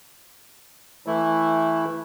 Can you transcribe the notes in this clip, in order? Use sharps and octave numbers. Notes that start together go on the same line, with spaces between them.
E3 A3 E4